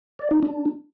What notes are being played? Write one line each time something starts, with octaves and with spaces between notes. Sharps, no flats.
D5
D#4
D4